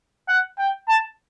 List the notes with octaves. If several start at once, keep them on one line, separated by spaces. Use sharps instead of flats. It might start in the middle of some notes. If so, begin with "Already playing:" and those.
F#5
G5
A5